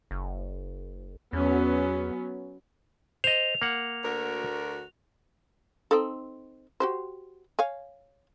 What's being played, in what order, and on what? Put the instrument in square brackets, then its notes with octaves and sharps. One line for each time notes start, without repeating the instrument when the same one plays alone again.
[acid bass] F#1
[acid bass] E2 [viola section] F#3 B3 C#4
[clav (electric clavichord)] C5 D#5 [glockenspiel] F7
[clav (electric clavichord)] A#3 F#5
[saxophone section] D2 F#4 A#4
[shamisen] C4 D#4 A4
F#4 G4 C5
C#5 F5 G#5